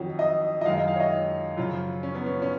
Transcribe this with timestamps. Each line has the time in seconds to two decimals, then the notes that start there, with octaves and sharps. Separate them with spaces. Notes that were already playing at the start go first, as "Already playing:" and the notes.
Already playing: F2 D#3 F#3
0.19 D#5
0.61 D#5
0.65 F#2 D#3 G#3 F5
0.77 D#5
0.88 F5
0.96 C#5
1.00 D#5
1.57 F#2 C#3 F3 F4
2.03 C#4
2.15 B3
2.26 C#4
2.42 C#4